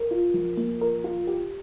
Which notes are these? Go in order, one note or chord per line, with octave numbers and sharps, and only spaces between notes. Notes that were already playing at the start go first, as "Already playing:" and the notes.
Already playing: A#4
F4
F3
A#3
A#4
F4
G4